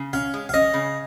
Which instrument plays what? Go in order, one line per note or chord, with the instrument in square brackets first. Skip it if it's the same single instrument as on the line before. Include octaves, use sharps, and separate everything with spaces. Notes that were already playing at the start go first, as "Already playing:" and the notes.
Already playing: [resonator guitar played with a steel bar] C#3
[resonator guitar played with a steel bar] C#4 [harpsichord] F5
[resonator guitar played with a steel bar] G#3
[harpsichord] F5
[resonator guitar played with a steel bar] C#4 [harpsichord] D#5
[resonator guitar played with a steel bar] C#3